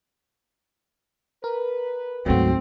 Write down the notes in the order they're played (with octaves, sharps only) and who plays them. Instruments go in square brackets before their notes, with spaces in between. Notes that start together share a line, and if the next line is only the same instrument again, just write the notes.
[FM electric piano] A#4 [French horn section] B4
[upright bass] D2 G#2 [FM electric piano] F#3 A3 F#4 [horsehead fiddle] C4